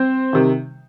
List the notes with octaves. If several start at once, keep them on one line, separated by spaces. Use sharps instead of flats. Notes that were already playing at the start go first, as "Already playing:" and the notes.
Already playing: C4 C5
C3 D#3